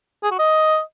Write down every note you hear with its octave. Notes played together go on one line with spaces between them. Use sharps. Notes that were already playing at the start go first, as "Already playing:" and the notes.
G#4
F#4
D#5